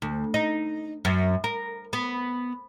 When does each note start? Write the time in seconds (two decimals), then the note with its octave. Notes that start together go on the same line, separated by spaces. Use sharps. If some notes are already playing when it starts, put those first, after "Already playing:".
0.02 D2
0.34 D#4
1.05 F#2
1.44 A#4
1.93 B3